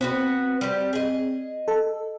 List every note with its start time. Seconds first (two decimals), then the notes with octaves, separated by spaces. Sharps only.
0.01 B3 C4 F#4 B4
0.61 G3 G4
0.93 G#4 D#5
1.68 A4